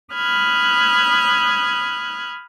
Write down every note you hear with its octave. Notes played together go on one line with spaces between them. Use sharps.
B5 D#6 F6 F#6 G#6